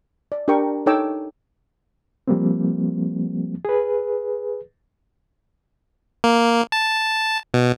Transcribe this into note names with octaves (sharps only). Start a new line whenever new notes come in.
D5
D4 G4 A#4 G5 C#6
D#4 A4 C#5 G5 D6 E6
F3 G3 A#3 C4
G#4 B4
A#3
A5
B2